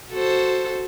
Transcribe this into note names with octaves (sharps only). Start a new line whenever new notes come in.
F#4 A4 C5